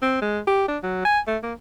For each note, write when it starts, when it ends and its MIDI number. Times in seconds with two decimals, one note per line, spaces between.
0.02 0.17 60
0.22 0.40 56
0.47 0.67 67
0.68 0.78 62
0.83 1.02 54
1.05 1.20 80
1.27 1.37 57
1.43 1.53 58